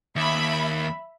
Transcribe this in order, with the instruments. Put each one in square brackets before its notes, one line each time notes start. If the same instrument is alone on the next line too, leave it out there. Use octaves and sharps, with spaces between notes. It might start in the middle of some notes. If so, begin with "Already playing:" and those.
[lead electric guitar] D#2 [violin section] E5 B5